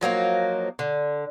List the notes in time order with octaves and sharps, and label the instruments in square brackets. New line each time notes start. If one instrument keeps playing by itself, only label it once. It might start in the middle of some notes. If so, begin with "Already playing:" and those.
[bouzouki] F3 F#3 A#3 D#4
D3